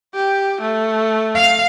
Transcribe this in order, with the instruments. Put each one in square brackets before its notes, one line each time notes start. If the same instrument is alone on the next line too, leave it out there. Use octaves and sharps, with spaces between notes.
[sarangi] G4
A3
[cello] F5